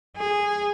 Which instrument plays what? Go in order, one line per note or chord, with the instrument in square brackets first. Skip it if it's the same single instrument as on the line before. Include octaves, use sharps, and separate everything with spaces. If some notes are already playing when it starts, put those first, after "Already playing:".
[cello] G#4